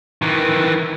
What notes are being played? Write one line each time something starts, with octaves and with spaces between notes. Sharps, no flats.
D#3 E3